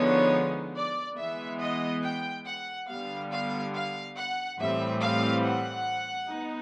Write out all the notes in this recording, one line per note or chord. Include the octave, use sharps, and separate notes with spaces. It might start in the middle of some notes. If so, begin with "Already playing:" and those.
Already playing: D3 F3 G#3 B3 D#4 C#5
D5
E3 G#3 B3 E5
D#5
G5
F#5
D3 G3 B3 F5
F5
F5
F#5
A2 E3 G3 C4 E5
F5
F#5
B3 D#4